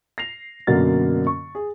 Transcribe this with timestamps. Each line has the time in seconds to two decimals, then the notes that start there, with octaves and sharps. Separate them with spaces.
0.18 A#6 C7 F7
0.67 F#2 B2 D3 A#3 F#4 A6
1.27 C#6
1.55 G#4